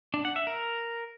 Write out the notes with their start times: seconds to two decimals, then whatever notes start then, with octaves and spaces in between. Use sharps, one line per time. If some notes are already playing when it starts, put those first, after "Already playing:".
0.14 D4
0.25 F#5
0.36 E5
0.47 A#4